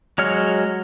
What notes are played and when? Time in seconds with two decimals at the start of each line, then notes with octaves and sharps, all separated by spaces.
0.18 F#3 G#3 C#5 F6